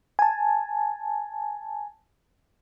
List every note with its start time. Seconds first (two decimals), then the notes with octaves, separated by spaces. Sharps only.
0.19 G#5 A5